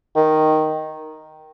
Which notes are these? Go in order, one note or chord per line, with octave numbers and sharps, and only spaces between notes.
D#3